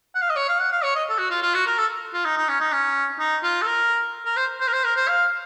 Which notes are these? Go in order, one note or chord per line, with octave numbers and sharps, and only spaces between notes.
F#5
F5
D#5
C#5
F5
F#5
F5
C#5
D#5
A4
F#4
F4
F4
F#4
A#4
A4
F4
D#4
D#4
C#4
D#4
C#4
D#4
F4
A4
A#4
A#4
C5
C5
A#4
C5
A#4
C5
F5